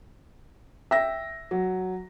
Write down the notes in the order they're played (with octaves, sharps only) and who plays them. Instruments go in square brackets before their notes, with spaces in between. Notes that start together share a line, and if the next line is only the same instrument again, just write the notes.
[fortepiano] E5 [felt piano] G5 A#6
[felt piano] F#3